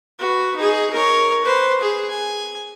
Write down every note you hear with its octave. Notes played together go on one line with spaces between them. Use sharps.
F#4 B4
D#4 G#4
A#4 C#5
B4 C5
G#4
G#5